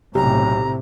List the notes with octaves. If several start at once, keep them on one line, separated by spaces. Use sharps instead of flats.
B1 A2 C3 G4 A#5